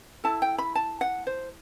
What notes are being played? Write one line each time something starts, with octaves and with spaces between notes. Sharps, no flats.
E4 A4 A5
G5
B5
A5
F#5
C5